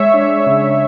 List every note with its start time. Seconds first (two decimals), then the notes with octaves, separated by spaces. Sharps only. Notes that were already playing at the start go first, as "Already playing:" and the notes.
Already playing: G#3 C#5 E5
0.14 D4
0.47 C#3